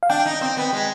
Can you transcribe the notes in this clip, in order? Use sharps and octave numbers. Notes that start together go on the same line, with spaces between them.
F5
D4 G5
D#4
C4
B3
G#3